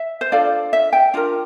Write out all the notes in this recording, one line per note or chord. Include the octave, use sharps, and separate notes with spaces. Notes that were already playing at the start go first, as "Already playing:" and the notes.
Already playing: E5
C5
D4 F4 A4 D5
E5
G5
D4 F4 A#4